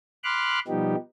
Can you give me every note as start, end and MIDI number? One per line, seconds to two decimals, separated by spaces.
0.24 0.59 83
0.24 0.59 84
0.24 0.59 86
0.24 0.59 89
0.24 0.59 90
0.68 0.95 47
0.68 0.95 53
0.68 0.95 55
0.68 0.95 59
0.68 0.95 63
0.68 0.95 67